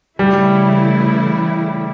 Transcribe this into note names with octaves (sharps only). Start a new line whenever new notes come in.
C#3 E3 G3 A3 E4